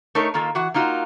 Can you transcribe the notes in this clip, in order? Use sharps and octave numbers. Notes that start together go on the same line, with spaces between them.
A3 D#4 A#4 C#5
D#3 A#3 F4 A4
E3 F#4 F#5
A#3 D#4 F4 F#4